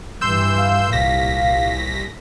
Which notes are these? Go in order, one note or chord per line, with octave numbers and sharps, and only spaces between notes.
G2 E3 C6 E6 G6
F5
C2 A#2 A#6 B6